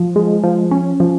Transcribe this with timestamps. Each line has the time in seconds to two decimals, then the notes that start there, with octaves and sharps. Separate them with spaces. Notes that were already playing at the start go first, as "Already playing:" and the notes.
Already playing: F3
0.16 G#3
0.44 F3
0.71 C#4
1.00 F3